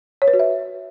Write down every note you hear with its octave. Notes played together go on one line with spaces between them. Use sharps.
C#5
B4
F#4
E5